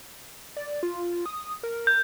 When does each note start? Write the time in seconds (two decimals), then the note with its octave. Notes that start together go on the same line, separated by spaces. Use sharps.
0.57 D5
0.83 F4
1.26 D#6
1.63 A#4
1.87 G6